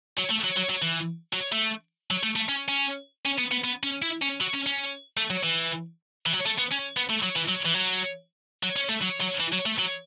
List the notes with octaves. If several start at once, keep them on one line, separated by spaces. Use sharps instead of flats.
F#3
A3
F#3
F#3
F#3
E3
F#3
A3
F#3
A3
A3
C#4
C#4
C#4
B3
B3
B3
C#4
E4
C#4
F#3
C#4
C#4
A3
F#3
E3
E3
F#3
A3
B3
C#4
B3
A3
F#3
E3
F#3
E3
F#3
F#3
C#4
A3
F#3
F#3
E3
F#3
A3
F#3